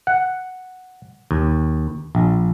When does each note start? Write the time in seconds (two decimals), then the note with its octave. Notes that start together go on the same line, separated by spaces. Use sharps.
0.07 F#5
1.31 D#2
2.15 A#1